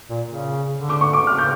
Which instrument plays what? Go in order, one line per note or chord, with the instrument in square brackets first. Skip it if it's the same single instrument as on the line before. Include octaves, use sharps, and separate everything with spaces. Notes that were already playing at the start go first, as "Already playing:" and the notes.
[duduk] A#2
C#3
D3
[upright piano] D6
C#6
D6
[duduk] C#3 [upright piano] F6
[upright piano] G6